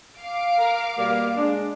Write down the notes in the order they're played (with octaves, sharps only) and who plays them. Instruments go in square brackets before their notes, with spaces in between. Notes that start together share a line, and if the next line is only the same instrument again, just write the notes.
[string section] F5 D6
[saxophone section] A#4
B2 G3 A#3
G#3 D4